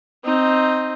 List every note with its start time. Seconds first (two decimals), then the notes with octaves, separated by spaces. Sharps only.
0.24 C4 D#4